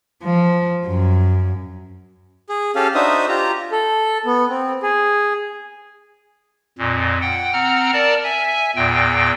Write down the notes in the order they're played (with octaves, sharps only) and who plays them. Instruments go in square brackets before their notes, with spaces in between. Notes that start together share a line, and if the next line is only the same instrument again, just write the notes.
[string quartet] F3
F#2
[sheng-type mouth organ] G#4
C#4 G4 A4 F5
D4 D#4 F#4 C5 E5 D#6
F4 G4 A#5
A4
B3
C4
G#4
[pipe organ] F2 A#2
F#5 G5
C4 F#5 A#5 F6
A#4 D5 A5
E5 G#5
E2 A#2 G5